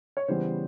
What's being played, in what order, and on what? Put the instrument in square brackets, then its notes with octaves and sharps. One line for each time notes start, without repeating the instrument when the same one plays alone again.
[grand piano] C#5
C#3 E3 G3 B3 C5